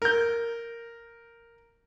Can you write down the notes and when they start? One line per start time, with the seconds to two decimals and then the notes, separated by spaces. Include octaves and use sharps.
0.02 A#4 G6